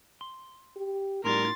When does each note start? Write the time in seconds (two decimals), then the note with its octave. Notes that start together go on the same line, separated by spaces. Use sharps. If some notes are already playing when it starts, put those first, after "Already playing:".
0.21 C6
0.76 G4
1.25 A2 G3 D#4 A#4 C6 A6